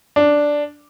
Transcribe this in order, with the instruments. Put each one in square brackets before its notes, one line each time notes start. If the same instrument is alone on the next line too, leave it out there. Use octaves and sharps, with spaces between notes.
[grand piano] D4